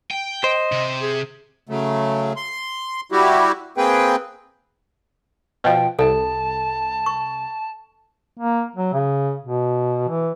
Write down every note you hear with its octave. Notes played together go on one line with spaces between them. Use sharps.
G5
C5 D#5
C3
G#4
C#3 F#3 A3
C6
G3 E4 F#4 G4
A#3 C4 G#4 B4 G5
B2 F3 G5
C2 A4 A5
C#6
A#3
F#3
C#3
B2
E3